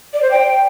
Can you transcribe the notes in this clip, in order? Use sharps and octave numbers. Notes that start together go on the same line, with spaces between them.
D5
C5
G5